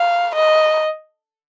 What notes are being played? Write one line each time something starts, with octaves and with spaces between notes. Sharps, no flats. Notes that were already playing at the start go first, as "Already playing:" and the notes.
Already playing: F5
D#5